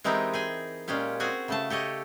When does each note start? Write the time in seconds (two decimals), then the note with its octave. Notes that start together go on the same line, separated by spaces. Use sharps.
0.04 E3 G#3 C4 D#4 G4 A#4
0.34 G#4 G5 G#5
0.88 A#2 G#3 C#4 G4 F5
1.20 C4 F#4 G#4 F#5 G#5
1.48 C#3 A3 A5
1.70 G4 A4 C#5 D#5